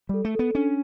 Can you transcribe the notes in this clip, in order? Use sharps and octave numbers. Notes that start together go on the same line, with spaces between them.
G3 A4
A3
B3 A4
C#4 D4